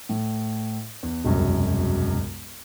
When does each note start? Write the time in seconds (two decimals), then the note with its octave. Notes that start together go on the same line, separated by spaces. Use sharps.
0.09 A2
1.03 E2
1.24 E1 C2 F#2